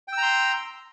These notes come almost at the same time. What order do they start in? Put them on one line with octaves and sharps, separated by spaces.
G5 E6 A#5 C6